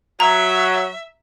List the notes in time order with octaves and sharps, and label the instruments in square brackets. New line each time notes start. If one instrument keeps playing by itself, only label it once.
[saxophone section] F#3 [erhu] E5 [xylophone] A#5